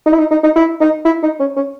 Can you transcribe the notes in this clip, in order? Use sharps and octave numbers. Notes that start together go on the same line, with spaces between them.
D#4
E4
D#4
D#4
D#4
E4
D#4
E4
D#4
C#4
C#4